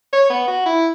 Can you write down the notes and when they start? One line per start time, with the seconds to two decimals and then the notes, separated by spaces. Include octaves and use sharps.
0.13 C#5
0.30 B3
0.48 F#4
0.66 E4